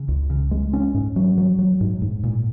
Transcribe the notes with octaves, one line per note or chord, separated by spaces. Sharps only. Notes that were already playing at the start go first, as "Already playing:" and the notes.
Already playing: C#3
C#2
C#3
G#3
C#4
G#2
F#3
F#3
F#3
G#2
G#2
A#2